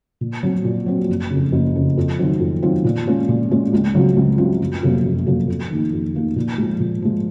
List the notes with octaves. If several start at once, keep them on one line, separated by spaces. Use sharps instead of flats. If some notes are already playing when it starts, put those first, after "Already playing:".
A#2
F#3 C4 F#4
A#2
F#3 C4 F#4
F#1
C#3
F2
F#1
F2 C#3
F2
D#3 F#3 C4 F4
F2
D#3 F#3 C4 F4
A#2
G#3 C#4 F4
A#2
G#3 C#4 F4
C#2
C#3 F#3 C4 F4
C#2
C#3 F#3 C4 F4
F#1
F2 C3 F#3 A#3
F#1
F2 C3 F#3 A#3
F2
D#3 A#3 D#4
F2
D#3 A#3 D#4
A#2
F3 G#3
A#2
F3 G#3